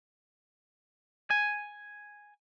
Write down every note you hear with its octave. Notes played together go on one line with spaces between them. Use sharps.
G#5